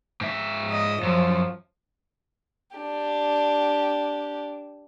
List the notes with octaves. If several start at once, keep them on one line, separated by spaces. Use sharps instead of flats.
G#2 E5
D#5
F#2 F3
D4 G4